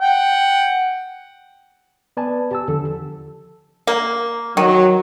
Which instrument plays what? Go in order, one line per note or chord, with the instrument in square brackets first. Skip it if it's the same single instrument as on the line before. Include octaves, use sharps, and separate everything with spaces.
[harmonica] F#5 G5
[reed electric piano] B3 B4 D5 G#5 A5
G4 A5 E6
E2 D3 F3 A4
[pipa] A#3
[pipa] D#3 [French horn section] F#3